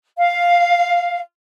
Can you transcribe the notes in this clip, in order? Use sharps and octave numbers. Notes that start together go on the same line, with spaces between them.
F5